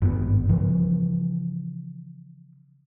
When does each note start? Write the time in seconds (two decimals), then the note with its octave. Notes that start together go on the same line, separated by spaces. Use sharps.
0.02 G#1 G2 B3
0.49 C#3 E3 F3